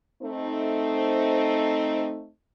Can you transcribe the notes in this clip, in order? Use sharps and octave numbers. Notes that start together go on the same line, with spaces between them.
A3 C4 D#4